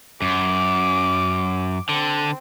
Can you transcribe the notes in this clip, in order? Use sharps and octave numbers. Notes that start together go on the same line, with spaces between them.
F#2 D6
D3 C4